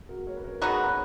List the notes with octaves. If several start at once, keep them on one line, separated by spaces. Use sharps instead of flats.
F#4 A#4
A#4 C#5
B4
A#4 C#5
B3 D#4 F#4 G#4 B4
C#5
B4